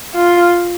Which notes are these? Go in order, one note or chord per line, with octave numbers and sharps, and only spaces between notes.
F4